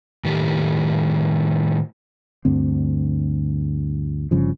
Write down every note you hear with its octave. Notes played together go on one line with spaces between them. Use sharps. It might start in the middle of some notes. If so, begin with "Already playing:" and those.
A2 D#3 G4
D2 G2 D3 C4
G1 G2 C#3 F3